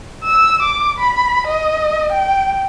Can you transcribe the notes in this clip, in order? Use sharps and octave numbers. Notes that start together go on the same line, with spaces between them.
E6
D6
B5
D#5
G5